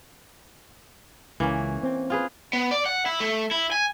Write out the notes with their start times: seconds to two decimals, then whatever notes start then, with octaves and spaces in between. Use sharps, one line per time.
1.40 C#2 E3 A#3 C#4
1.83 C4
2.10 F4 G#4 B4
2.53 B3
2.71 D5
2.86 F#5
3.06 E4
3.20 A3
3.51 E4
3.72 G#5